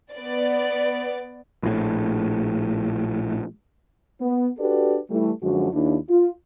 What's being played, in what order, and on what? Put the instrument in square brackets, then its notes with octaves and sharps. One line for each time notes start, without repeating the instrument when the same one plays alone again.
[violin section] B3 D5
[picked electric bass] A#1 A2
[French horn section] B3
D4 F#4 G4 A4 B4 D5
E3 G3 A3
F#2 D3 F3 G#3 F#4
D#2 D4 E4
F4